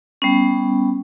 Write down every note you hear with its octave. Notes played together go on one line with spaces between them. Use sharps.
G3 B3 C#4